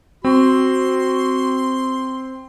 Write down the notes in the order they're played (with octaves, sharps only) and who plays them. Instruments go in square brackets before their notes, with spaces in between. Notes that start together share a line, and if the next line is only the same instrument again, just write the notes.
[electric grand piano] C4 [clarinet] F#4 [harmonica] C6